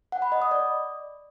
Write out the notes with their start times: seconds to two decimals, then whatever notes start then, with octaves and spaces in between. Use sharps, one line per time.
0.12 F#5
0.22 B5
0.32 D#5
0.42 D#6
0.51 D5